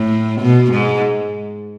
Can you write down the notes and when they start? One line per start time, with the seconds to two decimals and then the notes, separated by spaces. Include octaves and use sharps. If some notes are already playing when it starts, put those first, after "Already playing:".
Already playing: A2
0.41 B2
0.72 G#2